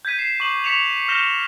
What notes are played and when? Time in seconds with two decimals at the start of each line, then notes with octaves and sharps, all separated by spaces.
0.05 G6 G#6 B6 D#7
0.19 C7 E7
0.40 C#6 D6 F#7
0.64 C#6 B6 C#7 E7 F7
1.09 F6 G6 A#6 E7 G7